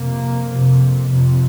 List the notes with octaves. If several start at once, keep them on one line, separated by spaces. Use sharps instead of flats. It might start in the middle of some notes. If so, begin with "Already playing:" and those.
Already playing: F2 C3 A#3
F2 C3
F2 C3